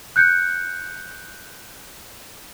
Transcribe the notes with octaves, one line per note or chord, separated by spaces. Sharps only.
F#6 G6 C#7